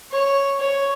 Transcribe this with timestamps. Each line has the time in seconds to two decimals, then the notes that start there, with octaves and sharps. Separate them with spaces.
0.12 C#5
0.60 C#5